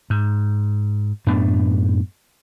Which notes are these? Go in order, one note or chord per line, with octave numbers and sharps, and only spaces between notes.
G#2
F#2 A2 B3 D4